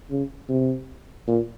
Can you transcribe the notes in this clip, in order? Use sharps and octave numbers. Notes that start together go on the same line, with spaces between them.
C#3
C3
A#2